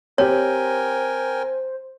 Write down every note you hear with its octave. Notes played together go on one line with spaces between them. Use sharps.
C4 G4 A#4 C5 C#5 G5 G#5